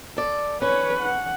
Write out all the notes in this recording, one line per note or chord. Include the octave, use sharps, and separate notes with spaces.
A4 D5
C#4 B4 C#5
F#5